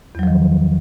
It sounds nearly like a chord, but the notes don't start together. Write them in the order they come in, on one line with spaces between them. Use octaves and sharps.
E2 F#3 F3 D#3